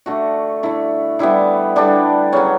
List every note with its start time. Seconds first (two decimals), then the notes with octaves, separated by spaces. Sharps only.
0.06 D3 A3 F#4
0.63 D3 A3 E4
1.19 D3 G3 B3 E4
1.76 D3 G3 B3 D4
2.32 C#3 F#3 B3 C#4